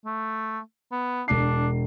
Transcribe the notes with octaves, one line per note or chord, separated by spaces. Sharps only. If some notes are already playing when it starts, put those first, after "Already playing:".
A3
B3
E1 D4 C7